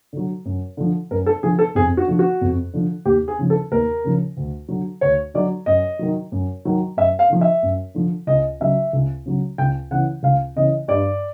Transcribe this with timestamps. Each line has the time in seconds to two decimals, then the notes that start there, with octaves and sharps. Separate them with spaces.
0.13 D3 F#3
0.45 F#2
0.77 D3 F3
1.11 F#2 A#4
1.26 A4
1.43 D3 F3 G#4
1.59 A4
1.75 F2 G#4
1.97 F#4
2.08 D3 F3
2.19 F#4
2.41 F2
2.73 D3 F3
3.05 D#2 G4
3.28 G#4
3.38 C#3 F3
3.50 A4
3.72 D#2 A#4
4.04 C#3 F3
4.37 D2
4.68 D3 F#3
5.01 D2 C#5
5.34 D3 F#3 D5
5.66 F#2 D#5
5.99 D#3 F#3
6.32 F#2
6.65 D#3 F#3
6.97 F#2 E5
7.19 F5
7.30 D3 F3
7.41 E5
7.63 F#2
7.95 D3 F3
8.27 C#2 D#5
8.60 C#3 F#3 E5
8.93 C#2
9.26 C#3 F#3
9.58 C#2 G5
9.91 C#3 E3 F#5
10.23 C#2 F5
10.56 C#3 E3 D#5
10.88 G2 D5